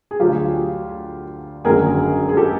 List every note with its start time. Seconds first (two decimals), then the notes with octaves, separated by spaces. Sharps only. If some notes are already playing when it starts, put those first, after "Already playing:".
0.11 G#4
0.19 D2 D3 F#3 F4 G4
1.64 G#1 F#2 D3 F#3 G#4 A#4
2.29 G#4
2.37 G4 A4